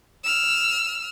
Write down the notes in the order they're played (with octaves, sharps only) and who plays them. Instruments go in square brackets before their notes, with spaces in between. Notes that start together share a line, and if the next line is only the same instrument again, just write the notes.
[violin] E6 F6